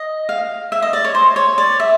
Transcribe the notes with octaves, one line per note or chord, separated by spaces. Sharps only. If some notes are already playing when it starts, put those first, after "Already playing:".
Already playing: D#5
F5
E5
D#5
D5
C#5
C5
C#5
D5
E5